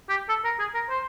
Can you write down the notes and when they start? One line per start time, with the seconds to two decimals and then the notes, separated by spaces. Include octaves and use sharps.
0.09 G4
0.29 A4
0.45 A#4
0.59 G#4
0.74 A#4
0.90 C5